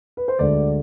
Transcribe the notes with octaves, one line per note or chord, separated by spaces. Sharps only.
B4
C5
D2 D3 G#3 D5